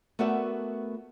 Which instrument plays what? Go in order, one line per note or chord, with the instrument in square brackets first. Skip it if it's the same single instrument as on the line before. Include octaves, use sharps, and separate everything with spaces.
[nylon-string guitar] A3 B3 F#4 A#4 D5 E5